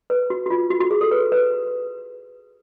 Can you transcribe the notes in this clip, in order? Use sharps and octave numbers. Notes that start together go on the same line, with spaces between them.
B4
F#4
F#4
F4
F#4
F#4
G#4
A4
B4
B4